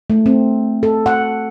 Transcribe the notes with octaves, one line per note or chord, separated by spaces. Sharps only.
A3
C4
A4
F#5